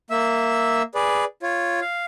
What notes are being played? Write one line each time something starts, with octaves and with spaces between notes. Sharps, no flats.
A#3 E5 E6
G#4 B4 D5
F4 C#5
F5